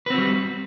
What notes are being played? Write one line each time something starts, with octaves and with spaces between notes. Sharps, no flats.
G3 C4 F#4 B4